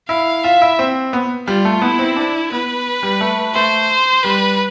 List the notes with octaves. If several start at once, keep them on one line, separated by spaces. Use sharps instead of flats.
E4 F5
F4 E5
E4
C4
B3
G3 F4
A3
B3 E4
C4
D4
B3 B4
G3
A3
A3 C5
G3 B4